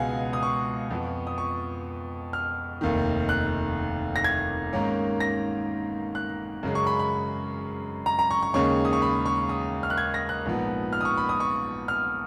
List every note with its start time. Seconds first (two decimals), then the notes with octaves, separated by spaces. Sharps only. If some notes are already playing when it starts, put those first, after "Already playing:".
Already playing: C#2 B2 G#3 B3 F5 F#5 G#5
0.33 D#6
0.43 C#6
0.90 F2 F3 B3
1.27 D#6
1.38 C#6
2.33 F6
2.81 F1 D#2 D#3
3.29 F#6
4.16 A#6
4.24 G#6
4.73 G#2 D#3 A#3 C#4
5.20 A#6
6.15 F#6
6.63 F#2 C#3 G#3
6.75 C#6
6.87 B5
6.99 B5
8.06 A#5
8.19 A#5
8.31 C#6
8.43 C#6
8.54 D#2 C#3 G#3 C#4 C#6
8.85 D#6
8.93 C#6
9.02 B5
9.26 C#6
9.49 D#6
9.83 F6
9.90 F#6
9.98 G#6
10.14 A#6
10.29 F#6
10.46 A#1 G#2 F3 B3
10.93 F6
11.01 D#6
11.05 C#6
11.17 B5
11.29 D#6
11.40 C#6
11.88 F6